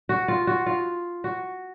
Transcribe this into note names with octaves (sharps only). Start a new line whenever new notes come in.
F#4
F4
F#4
F4
F#4